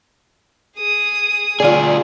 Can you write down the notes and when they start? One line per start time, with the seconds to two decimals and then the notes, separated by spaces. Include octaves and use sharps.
0.77 G#4 D#6
1.60 D2 F4 G#4 D5